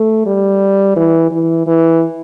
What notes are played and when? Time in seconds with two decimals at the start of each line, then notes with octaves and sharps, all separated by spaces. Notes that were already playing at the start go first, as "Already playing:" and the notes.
Already playing: A3
0.26 G3
0.96 E3
1.31 E3
1.67 E3